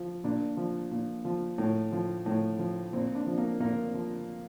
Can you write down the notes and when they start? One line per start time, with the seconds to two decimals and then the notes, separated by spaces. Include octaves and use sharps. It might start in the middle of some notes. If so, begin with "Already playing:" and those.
Already playing: F3
0.24 A#2 D4
0.57 F3
0.91 A#2
1.25 F3
1.58 A2
1.92 F3
2.26 A2
2.59 F3
2.93 A#2 C4
3.15 D4
3.26 F3
3.38 A#3
3.60 A#2 A#3
3.94 F3